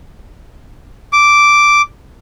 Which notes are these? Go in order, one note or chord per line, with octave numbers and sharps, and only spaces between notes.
D6